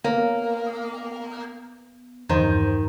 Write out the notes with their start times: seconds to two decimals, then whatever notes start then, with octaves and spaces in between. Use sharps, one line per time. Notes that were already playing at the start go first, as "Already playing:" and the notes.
0.04 A#3 B3 C#5
2.29 E2 G2 D#3 F3 C5 G6